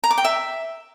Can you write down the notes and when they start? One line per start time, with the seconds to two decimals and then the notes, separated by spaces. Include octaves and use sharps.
0.04 A#5
0.11 D6
0.18 G5
0.25 E5